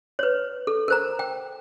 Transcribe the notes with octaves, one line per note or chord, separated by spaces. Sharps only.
B4 C#5
A4
A#4 C5 A#5
G5